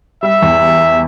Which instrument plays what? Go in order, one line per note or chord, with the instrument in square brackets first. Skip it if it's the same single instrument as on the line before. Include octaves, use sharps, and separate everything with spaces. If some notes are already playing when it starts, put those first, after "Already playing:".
[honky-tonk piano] G3 [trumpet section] E5
[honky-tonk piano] E2